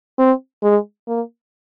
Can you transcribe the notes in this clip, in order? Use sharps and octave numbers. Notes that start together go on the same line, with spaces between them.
C4
G#3
A#3